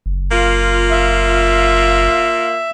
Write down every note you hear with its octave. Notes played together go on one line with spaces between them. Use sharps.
F#1
A#3 F4
E5